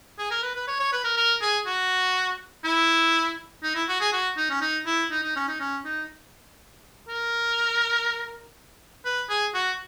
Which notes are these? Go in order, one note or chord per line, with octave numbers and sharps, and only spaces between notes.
G#4
A#4
B4
B4
C#5
C#5
B4
A#4
A#4
G#4
F#4
E4
D#4
E4
F#4
G#4
F#4
D#4
C#4
D#4
E4
D#4
D#4
C#4
D#4
C#4
D#4
A#4
B4
G#4
F#4